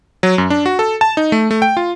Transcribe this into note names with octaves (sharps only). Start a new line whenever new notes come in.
F#3
F#2
D4
F#4
A4
A5
D#4
A3
A3
G5
F4